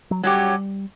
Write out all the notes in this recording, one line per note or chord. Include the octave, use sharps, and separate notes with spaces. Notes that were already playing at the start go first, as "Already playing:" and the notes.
F#3
F#3 G3 C#4 G4